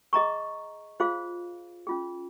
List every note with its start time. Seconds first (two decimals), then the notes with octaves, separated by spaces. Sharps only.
0.13 G#4 D#5 A#5 C#6
1.00 F4 G#4 C5 F5
1.87 C#4 F4 G#4